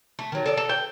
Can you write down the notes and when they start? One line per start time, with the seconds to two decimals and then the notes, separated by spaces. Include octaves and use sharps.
0.19 A3
0.32 D#3 F#3
0.46 A4 D5 D#5
0.57 A4
0.69 G5